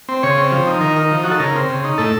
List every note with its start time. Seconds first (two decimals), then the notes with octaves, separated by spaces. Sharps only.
0.09 C4
0.23 C#3 C#5
0.38 C4
0.52 F3
0.67 D#4
0.81 D#3 A#4
0.96 D#4
1.11 F3
1.24 D#4 F#4
1.31 A4
1.39 C#3 A#4
1.55 C4
1.69 C#3
1.84 D#4
1.98 A2 A4